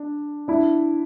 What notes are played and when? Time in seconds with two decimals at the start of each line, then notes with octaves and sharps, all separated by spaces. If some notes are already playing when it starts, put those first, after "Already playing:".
Already playing: D4
0.48 D4 E4